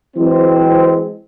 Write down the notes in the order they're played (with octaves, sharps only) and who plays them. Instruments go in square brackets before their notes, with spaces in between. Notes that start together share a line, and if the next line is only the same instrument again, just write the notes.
[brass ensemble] E3 F#3 G#3 C4